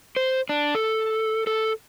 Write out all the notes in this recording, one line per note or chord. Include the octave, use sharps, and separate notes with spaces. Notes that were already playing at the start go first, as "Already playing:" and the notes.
C5
D4
A4
A4